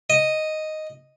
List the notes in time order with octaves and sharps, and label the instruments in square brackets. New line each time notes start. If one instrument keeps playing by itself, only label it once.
[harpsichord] D#5